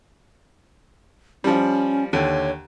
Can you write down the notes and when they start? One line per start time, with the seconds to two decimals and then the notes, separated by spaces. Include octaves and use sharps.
1.44 F3 G3 C#4
2.13 D#2 D3 C#5